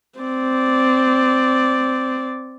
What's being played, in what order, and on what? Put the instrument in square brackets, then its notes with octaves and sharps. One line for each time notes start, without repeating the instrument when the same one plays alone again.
[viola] C4 D5